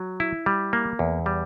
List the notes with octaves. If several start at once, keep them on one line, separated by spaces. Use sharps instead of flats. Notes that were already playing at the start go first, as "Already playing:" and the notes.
Already playing: F#3
E4
G3
A#3
E2
G3